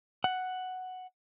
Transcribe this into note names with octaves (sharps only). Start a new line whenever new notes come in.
F#5